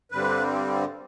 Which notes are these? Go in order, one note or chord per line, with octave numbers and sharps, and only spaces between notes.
G2 D3 G3 C4 B4